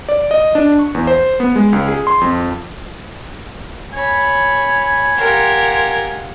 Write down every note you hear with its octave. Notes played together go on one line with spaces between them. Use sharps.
D5
D#5
D4
C#6
E2
C5
B3
G#3
C#2
G#4
C6
F2
C#5 G#5 B5
F4 G4 A#4 F#5